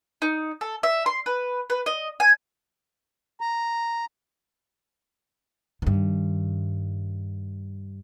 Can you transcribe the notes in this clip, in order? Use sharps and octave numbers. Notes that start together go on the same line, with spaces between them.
D#4
A4
E5
C6
B4
B4
D#5
G#5
A#5
G2 D#3